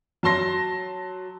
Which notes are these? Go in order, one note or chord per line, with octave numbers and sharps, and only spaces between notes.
F#3 A5 C6 A#6